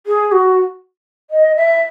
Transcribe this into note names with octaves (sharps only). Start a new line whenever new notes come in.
G#4
F#4
D#5
E5